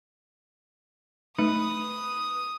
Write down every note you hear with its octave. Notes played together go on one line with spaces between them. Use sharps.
A3 D#4 B4 D#6 C#7